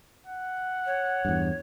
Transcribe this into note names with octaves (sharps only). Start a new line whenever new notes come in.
F#5
C#5
E2 G2